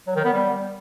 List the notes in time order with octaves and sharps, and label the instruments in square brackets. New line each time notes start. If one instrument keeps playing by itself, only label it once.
[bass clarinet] F#3
D#3
B3
G3